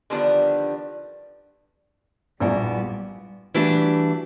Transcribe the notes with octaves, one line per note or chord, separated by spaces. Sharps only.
D3 D#3 F3 G3 B3 D4
A#1 A2 G3 B3 E4 F#4 D5 G#5
E3 G3 A3 D4 F#4